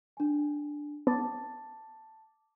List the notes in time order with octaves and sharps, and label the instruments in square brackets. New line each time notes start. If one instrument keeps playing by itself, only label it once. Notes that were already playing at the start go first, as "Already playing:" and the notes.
[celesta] D4 G#5
[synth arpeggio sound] B3 [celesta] A5 D6 A6